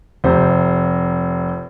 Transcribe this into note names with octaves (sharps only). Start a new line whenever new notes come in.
F1 C3 C5